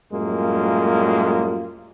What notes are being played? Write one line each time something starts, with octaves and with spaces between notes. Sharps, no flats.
F#2 A2 G3 G#3 A#3 F4